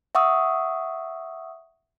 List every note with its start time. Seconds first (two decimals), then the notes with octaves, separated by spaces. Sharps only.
0.15 E5 F#5 C#6 D#6 E6